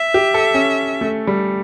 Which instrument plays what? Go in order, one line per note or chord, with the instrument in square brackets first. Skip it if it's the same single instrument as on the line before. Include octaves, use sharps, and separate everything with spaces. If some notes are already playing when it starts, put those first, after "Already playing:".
Already playing: [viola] E5
[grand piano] G4
A4
C#4
A3
G3